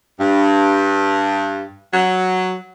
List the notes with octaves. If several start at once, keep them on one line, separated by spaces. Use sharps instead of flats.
G2
F#3